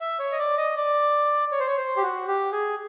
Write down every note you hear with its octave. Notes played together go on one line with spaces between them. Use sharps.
E5
C#5
D#5
D5
D#5
D5
C#5
C5
C#5
C5
G4
F#4
G4
G#4